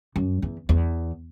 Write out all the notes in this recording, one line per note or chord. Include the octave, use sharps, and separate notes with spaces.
F#2
E2
E2